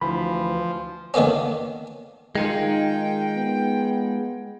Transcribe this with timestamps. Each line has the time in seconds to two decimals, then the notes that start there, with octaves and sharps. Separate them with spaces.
0.01 D2 E3 F3 B5
1.14 D3 D#3 A#3 B3 C#4
2.35 D#3 G#3 D#4 F4 G5
3.36 B3